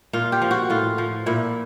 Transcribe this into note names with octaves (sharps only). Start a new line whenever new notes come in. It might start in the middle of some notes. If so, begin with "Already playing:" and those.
A#2 F4
G4
F3
F#4
A2 F4
F3
A#2 E4